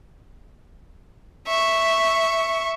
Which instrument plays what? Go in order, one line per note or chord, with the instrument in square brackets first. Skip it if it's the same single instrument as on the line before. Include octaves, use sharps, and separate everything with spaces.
[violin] E5 C#6